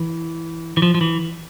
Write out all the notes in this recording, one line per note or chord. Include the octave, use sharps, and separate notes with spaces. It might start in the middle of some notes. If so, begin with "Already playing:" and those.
Already playing: E3
E3
F3
F3
E3